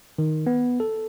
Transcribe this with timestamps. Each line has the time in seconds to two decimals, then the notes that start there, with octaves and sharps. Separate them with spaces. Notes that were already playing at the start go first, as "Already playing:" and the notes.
0.18 D#3
0.47 B3
0.80 A4